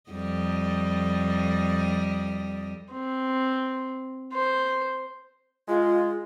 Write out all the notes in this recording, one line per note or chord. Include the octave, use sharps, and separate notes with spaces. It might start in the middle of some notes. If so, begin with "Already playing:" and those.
F2 G3 D#5
C4
C5
G#3 F4